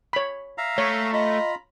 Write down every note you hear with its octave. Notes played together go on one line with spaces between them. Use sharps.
C#5 B5
E5 F5 A#5
A3 C#5
F4 D#5 A#5 B5